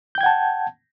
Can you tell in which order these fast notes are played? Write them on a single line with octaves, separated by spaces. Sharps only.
G6 G5 G#6 F#5 A5